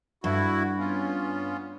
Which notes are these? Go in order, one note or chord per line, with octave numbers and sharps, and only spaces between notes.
G2 E4 F#4
B3 C#4 F4